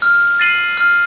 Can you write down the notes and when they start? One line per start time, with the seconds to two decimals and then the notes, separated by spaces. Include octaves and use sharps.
0.02 F6
0.40 A6 C7 D#7 F#7
0.77 F6